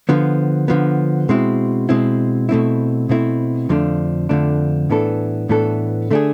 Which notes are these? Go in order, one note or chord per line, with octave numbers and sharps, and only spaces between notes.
D3 F3 B3
D3 F3 B3
B2 G#3 C4 E4
B2 G#3 C4 E4
B2 A3 C4 E4
B2 A3 C4 E4
F2 D3 F3 A3 D4
F2 D3 F3 A3 D4
A2 E3 B3 D4 A4
A2 E3 B3 D4 A4
D3 A3 D4 G#4